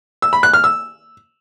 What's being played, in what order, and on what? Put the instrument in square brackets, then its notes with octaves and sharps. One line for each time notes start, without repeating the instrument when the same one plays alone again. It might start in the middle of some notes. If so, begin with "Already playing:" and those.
[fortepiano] E6
B5
F#6
F6
E6